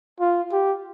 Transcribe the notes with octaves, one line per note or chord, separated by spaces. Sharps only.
F4
G4